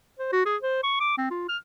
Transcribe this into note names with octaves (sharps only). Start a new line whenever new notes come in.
C5
F#4
G#4
C5
C#6
D6
C4
F4
F6